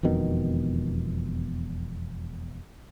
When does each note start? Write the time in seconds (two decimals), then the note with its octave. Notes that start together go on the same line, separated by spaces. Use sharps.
0.03 E1 F2 B2 D#3